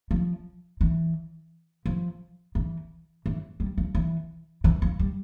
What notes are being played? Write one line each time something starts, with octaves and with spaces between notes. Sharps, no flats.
F3
E3
F3
E3
E3
G3
F3
E3
E3
F3
G3